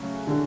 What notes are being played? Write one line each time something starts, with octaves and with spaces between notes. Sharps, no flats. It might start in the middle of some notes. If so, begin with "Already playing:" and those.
Already playing: C#3 F#3 A3 C#4 F#4
D3